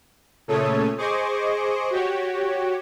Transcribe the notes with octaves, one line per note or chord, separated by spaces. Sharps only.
A#2 C#3 A3 A4 C#5 D#6
G#4 C5 D#5 C#6 D6
F#4 G4 C#5